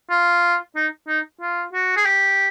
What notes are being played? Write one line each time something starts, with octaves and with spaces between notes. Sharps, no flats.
F4
D#4
D#4
F4
F#4
G#4
G4